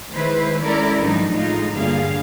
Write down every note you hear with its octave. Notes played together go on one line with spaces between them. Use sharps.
D#3 G#3 E4 B4 C5
G#3 C#4 E4 A4 A#4 D5
G#2 D#3 F3 F#3 D4 D#4
A2 G#3 D#4 F4
G2 A#2 D3 G#4 F5